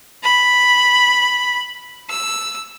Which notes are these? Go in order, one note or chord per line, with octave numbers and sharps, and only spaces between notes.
B5
E6